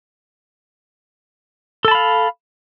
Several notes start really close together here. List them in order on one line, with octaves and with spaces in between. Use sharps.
A4 A5 B5 F5